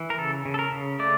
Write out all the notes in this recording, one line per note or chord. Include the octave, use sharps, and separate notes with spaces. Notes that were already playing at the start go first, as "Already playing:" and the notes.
Already playing: E3
A#4
C#3 A4
C#3
A4
A#4
C#3
A3 D5